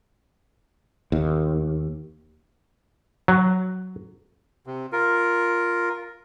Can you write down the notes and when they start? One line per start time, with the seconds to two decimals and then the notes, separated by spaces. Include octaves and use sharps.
1.12 D#2
3.28 F#3
4.67 C3
4.93 F4 A#4